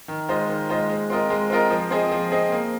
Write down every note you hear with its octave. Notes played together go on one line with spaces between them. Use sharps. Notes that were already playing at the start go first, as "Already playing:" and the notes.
D#3
G#3 F4 C5 D#5
D#3
G#3 F4 C5 D#5
G#3
C4 F4 A#4 D#5
G#3
C4 F4 A#4 D#5
F3
C4 G#4 D#5
F3
C4 G#4 D#5
A#3